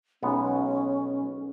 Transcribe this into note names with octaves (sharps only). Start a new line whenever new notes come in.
B1 G#3 B3 C#4